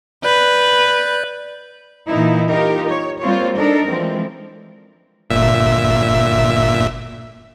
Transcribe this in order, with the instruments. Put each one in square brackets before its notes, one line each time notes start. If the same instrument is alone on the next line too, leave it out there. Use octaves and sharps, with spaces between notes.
[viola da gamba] B4 [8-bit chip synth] D5 F#6 G6
[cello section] A#2 E3 A#3 D#4 E4
D#4 F4 G4 A#4
C#5
G3 A#3 C4 F4 C5 C#5
D4 D#4 A4 A#4
E3 F3 G#3 A3 C4
[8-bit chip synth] G1 A#2 E5